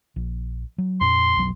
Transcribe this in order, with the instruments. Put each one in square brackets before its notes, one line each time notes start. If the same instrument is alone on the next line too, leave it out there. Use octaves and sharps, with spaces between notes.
[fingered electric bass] A#1
F#3
[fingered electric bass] F2 A#2 [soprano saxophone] C6
[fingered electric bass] F1 B1 F#3